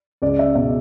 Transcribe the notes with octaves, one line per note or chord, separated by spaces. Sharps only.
C#2 D5
E5
B2 E5